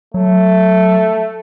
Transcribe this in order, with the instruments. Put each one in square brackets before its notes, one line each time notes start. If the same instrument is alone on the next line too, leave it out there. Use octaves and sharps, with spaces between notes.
[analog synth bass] F#3 [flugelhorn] A3